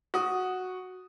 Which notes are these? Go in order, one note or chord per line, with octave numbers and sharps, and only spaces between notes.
F#4 D#6